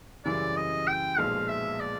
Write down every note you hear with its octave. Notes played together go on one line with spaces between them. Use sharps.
F#2 C#3 E3 G3 D5
D#5
G5
B1 A#2 F3 G#3 B3 F5
E5
D5